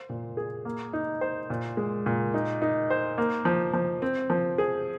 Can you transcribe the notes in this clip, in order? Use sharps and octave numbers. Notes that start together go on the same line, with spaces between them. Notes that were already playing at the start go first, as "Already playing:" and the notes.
Already playing: C5
A#2
G#4
A#3
D#4
C5
A#2
G#3
A#2
D#4
D#4
C5
A#3
F3
F3
C4
F3
G#4